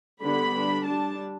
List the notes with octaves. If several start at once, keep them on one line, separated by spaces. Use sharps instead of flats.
D3 G3 B3 D4 B5
G3 D4
G3 D4 A5